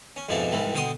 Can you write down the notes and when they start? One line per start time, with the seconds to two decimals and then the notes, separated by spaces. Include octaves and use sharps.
0.16 C#4
0.29 F2 G#2 B2 E3 F3 D4
0.52 C2 G#2 E3 G3
0.74 B2 D3 G5 C6 D#6